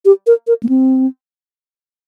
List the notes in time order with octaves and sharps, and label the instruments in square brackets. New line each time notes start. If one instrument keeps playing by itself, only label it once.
[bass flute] G4
A#4
A#4
A#3
C4